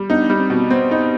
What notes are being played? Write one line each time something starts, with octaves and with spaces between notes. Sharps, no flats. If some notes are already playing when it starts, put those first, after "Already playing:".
Already playing: G3
B3 D4 D#4
G3
C4
B2
B3 C4
D#4